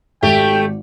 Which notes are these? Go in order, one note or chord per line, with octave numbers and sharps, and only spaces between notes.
G#1 A3 G4 G5